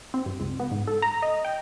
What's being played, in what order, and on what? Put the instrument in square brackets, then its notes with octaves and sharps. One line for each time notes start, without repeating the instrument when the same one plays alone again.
[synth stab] C4
G2
C#2
B3
G#2
A4
A#5
D#5
G5